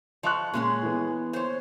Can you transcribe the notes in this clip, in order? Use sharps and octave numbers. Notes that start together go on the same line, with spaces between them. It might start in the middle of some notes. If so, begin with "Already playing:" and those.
F3 D#5 C#6 F#6
A#2 G#3 C#4 G#4
E3 B3
C5 C#5